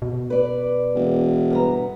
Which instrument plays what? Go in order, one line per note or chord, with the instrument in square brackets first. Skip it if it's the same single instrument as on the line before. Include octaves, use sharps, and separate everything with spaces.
[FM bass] B2
[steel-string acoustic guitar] B4 D5
[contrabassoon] E1
[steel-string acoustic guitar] G2 B3 A#5